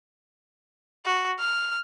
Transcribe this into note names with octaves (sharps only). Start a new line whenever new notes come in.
F#4
F6